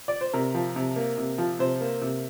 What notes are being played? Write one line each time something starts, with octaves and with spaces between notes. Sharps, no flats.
D5
C5
C3 A#4
F3
C3
A#3
C3
F3
C3 C5
A#3
C3